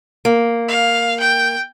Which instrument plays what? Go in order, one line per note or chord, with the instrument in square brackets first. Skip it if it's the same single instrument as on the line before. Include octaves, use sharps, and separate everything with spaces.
[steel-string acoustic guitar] A#3
[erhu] F5
G5